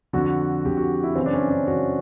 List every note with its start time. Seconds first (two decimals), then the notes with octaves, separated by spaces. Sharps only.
0.13 F2 D3 F#4
0.65 F2 D3 G4
0.77 F#4
1.03 E4
1.16 F#2 C#3 E3 C4
1.26 D4
1.34 C#4
1.50 D4
1.67 F#2 C#3 E3 F#4